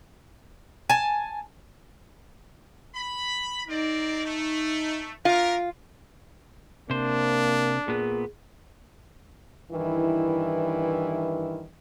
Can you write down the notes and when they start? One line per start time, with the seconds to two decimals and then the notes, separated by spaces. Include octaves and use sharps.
0.89 G#5 A5
2.95 B5
3.69 C4 D#4 A#4 D5
4.25 A3
5.25 F4 G4 A#4
6.90 C3 A#3 D4 C5
7.88 A#2 B3 G#4
9.72 G2 D#3 E3 E4